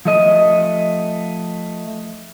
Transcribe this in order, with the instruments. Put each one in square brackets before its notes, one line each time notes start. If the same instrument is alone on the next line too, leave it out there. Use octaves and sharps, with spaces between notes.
[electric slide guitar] F3 A3 D#5